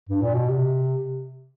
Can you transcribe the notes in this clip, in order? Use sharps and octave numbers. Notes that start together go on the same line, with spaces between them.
G2
A#2
B2
C3